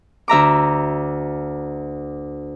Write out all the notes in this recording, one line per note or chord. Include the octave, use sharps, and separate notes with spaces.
D2 E5 A#5 D6